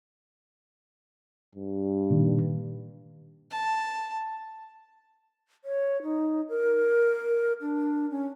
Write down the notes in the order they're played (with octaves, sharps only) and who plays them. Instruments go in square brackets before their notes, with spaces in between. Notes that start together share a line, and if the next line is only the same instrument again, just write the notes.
[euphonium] G2
[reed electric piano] A#2 D#3
[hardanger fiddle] A5
[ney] C#5
D#4
A#4
D4
C#4